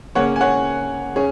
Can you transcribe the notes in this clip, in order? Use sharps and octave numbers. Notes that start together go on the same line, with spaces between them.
C#3 A#3 C#4 C#5 F#5
G#5
C#5 F#5
C#4 G#4 C#5